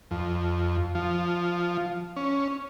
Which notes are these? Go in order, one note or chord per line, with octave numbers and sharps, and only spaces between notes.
F2
F3
C#4